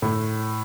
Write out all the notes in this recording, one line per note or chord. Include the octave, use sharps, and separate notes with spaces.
A2